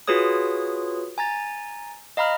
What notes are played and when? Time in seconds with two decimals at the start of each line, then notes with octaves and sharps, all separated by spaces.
0.08 F4 F#4 G#4 B4 C#5 D#6
1.18 G#5 A#5 A6
2.17 D#5 F5 A#5 B5 F6